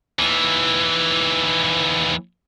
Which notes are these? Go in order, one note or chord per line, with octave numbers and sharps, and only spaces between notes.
D#2 E3